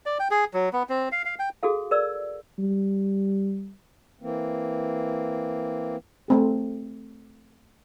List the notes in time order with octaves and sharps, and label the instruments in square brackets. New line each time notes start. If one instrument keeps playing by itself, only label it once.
[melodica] D5
G5
G#4
F#3
B3
C4
F5
F5
G5
[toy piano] F#4 G#4 A4 F5
A#4 B4 D5 E6
[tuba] G3
[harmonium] E3 A#3 C4
[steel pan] A3 C4 G#4